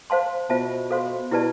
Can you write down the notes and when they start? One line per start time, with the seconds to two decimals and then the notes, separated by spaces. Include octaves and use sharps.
0.10 C5 F5 A5 C6
0.50 B2 F4 C5 E5 A5
0.91 A4 C5 F5 C6
1.31 B2 E4 G4 B4 D5 A5